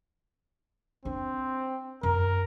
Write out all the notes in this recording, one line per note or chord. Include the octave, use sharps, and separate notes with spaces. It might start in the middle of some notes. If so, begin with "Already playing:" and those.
C4 D4
F#2 A#4